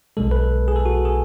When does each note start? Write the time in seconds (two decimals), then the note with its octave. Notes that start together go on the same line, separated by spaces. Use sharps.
0.17 B1 B2 G#3 A4
0.31 B4
0.68 G#4
0.76 A4
0.86 F#4
1.05 G#4